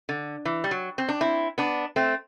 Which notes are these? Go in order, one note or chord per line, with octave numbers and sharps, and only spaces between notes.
D3
E3
G3
F#3
C4
D4
C4 E4
B3 D4
A3 C4